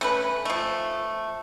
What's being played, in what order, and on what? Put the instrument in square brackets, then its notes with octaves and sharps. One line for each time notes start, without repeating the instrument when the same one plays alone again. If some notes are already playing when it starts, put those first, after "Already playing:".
[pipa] A3 C#4 B4
F3 A3